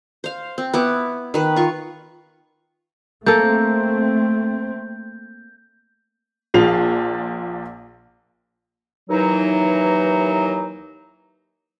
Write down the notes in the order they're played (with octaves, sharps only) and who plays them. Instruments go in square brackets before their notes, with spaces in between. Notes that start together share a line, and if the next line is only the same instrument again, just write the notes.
[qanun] C5 F5
C4
B3 E4 D6
D#3 B4
F4 C#6
[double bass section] A3 C4 [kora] A#3 A4 [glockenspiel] G6
[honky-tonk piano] A#1 A#2 F3 C7 F7
[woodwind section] D#2 E3 F#3 D#4